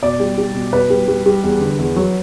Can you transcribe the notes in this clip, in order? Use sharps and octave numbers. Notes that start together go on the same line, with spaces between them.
B2 D5
G3
G3
B2
B2 B4
G3
G3
G3
E2
D3
E2
F#3